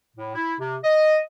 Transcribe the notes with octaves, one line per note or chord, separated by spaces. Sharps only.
A2
E4
C3
D#5